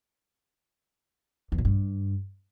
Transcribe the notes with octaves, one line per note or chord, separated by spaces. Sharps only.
E2
B2
G2